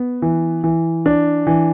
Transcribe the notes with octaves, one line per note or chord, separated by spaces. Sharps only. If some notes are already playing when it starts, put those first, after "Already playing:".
Already playing: B3
E3
E3
D4
E3